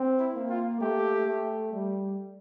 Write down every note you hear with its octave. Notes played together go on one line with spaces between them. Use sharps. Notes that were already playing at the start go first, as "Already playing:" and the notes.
Already playing: C4
E4
A#3
F4
A3 G4
A3
G3